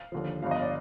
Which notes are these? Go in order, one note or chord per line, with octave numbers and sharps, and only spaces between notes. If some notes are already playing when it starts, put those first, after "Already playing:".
Already playing: F5
D#2 D3 F3
G1 G2 F3 F5
D#5
D5